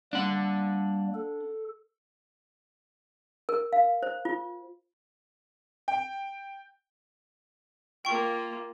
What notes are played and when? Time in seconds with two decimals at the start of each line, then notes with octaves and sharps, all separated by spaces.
0.13 G3 A#3 D4 F#5
1.14 A4
3.49 A#4
3.73 F5
4.03 C5
4.25 F4
5.88 G5
8.05 A#3 F4 G5 C#6